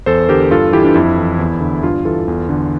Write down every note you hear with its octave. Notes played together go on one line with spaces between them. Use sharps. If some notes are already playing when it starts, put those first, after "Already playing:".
E2 A4 C5
D3 G4 A#4
G2 F4 A4
E3 E4 G4
D4
F2 E4
E3
E2
D3
G2 D4 F4
E3 F4 A4
E2
D3